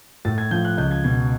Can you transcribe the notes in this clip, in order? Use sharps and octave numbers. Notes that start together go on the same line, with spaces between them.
A2 A6
G#6
F3 G6
F#6
C#2 G6
G#6
B2 G#6